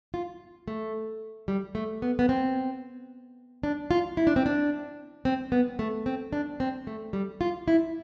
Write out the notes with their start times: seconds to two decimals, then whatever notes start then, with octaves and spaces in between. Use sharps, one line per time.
0.14 F4
0.68 A3
1.48 G3
1.75 A3
2.02 B3
2.19 B3
2.29 C4
3.63 D4
3.91 F4
4.17 E4
4.27 D4
4.36 C4
4.46 D4
5.25 C4
5.52 B3
5.79 A3
6.06 C4
6.33 D4
6.60 C4
6.87 A3
7.13 G3
7.41 F4
7.68 E4